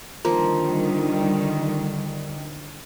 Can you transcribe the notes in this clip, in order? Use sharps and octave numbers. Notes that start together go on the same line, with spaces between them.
D3 D#3 F3 G3 A#3